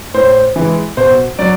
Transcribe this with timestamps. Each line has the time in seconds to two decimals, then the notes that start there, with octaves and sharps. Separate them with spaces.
0.14 A2 C5
0.56 E3 G#3
0.97 B2 C5
1.39 F#3 D5